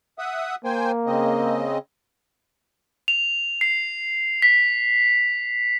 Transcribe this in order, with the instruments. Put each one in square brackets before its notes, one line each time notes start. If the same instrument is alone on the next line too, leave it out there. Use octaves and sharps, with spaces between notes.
[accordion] E5 F#5 D#6
[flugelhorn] A#3 [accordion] C5 G5 G#5
[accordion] C#3 C4 D#5
[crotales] F7
C7
B6